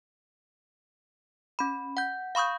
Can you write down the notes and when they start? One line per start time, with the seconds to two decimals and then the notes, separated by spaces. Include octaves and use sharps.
1.59 C#4 B5
1.97 F#5 G6
2.35 F5 B5 C#6 D#6 G6